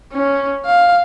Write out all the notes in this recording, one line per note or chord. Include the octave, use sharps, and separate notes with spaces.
C#4
F5